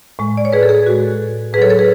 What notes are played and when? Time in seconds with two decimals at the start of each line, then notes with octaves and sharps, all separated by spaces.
0.19 A2 G#3
0.37 D5
0.45 C#5
0.53 G#4 B4
0.63 A4
0.69 G#4
0.86 A2 G#3 F#4
1.53 A2 G#4 B4
1.58 F#3 A4 C#5
1.70 A4 C#5
1.79 G#4 B4